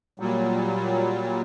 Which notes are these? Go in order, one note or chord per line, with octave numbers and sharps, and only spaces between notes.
A#2 F#3 G3